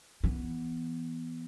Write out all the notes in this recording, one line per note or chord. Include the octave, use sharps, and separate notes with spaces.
E3 B3